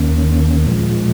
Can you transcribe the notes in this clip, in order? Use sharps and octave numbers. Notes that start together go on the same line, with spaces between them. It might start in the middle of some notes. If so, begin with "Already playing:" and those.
Already playing: D#2 D#3 A#3 C#4
A#2 F3 G#3